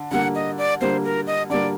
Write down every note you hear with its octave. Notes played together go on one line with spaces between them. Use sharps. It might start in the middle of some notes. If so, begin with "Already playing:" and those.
Already playing: D3
D3 G3 A#3 F#5
D#5
D5
D3 G3 A#3 C5
A#4
D#5
D3 G3 A#3 D5